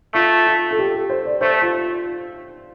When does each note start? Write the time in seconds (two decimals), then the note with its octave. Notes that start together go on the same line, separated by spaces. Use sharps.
0.14 A3 F4
0.47 F4
0.71 A4
0.79 G4
0.95 A4
1.10 C5
1.25 D5
1.41 A3 C5
1.62 F4